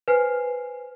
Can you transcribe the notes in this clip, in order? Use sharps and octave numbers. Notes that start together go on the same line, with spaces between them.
B4 C5 G#5 F6 C7